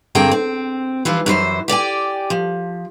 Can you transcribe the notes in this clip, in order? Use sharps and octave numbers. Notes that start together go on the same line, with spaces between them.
G2 D3 C4 G#4 A#4 G5
C4
E3 F3 G3 F4
F#2 E3 C5 E5
G4 D5 G5 G#5
F3